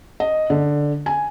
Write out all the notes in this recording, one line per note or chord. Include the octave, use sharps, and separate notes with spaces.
D#5
D3
G#5